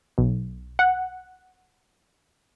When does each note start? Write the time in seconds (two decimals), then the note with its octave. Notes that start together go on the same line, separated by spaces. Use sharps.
0.18 B1
0.79 F#5